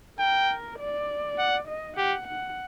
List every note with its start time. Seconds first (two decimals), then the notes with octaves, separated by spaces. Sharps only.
0.19 A#4 G5
0.79 D5
1.39 F#5
1.68 D#5
1.98 G4 F#5
2.28 F#5